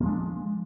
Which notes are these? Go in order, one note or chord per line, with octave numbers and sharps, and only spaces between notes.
F3 G#3 A#3 D4